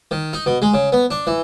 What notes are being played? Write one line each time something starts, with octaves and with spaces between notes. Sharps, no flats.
D#3
D#4
B2
G#3
C#3
B3
D4
E3